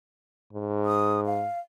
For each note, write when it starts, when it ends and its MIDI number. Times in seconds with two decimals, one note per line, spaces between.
0.53 1.46 44
0.86 1.20 87
1.26 1.59 77